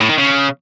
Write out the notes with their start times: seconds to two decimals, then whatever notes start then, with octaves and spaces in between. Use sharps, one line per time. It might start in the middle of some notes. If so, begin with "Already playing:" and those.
0.01 A2
0.09 D#3
0.18 C#3